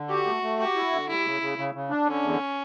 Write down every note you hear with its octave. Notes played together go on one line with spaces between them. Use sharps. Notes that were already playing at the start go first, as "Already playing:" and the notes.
Already playing: D3
F#4 G4
A3
A3
F#4 G4
E4
D3
G3 E4
C#3
C#3
C#3
C#3
D4
D3 C#4
E2